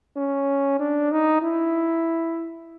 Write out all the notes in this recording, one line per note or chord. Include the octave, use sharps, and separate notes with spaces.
C#4
D4
D#4
E4